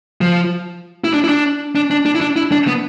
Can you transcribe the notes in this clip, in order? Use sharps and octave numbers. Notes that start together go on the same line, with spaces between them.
F3
E4
D4
E4
D4
D4
D4
D4
E4
D4
E4
D4
B3